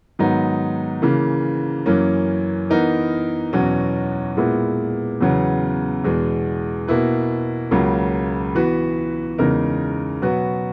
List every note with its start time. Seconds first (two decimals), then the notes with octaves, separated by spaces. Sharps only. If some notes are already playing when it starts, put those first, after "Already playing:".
0.19 G#2 D#3 F#3 B3 D#4
1.02 C#3 E3 A#3
1.86 F#2 E3 A#3 C#4
2.70 E3 B3 D#4 A#4
3.53 E2 B2 F#3 C#4 F#4
4.37 A#2 G#3 B3 E4
5.21 E2 C#3 F#3 B3
6.04 E2 B2 G#3
6.88 B2 A#3 E4 B4
7.71 C#2 C#3 F#3 A#3
8.55 E3 B3 F#4 B4
9.38 E2 C#3 G#3 D#4 A#4
10.22 B2 F#3 B3 F#4 B4